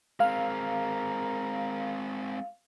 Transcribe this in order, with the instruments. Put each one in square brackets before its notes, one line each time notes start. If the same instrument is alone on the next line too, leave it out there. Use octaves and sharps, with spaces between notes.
[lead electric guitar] G#3 C4 [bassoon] A#4 [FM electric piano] F5